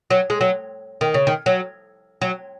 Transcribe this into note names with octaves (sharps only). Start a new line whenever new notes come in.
F#3
G#3
F#3
D#3
C#3
D#3
F#3
F#3